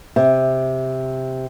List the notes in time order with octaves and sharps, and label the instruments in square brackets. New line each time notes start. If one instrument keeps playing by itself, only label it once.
[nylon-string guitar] C3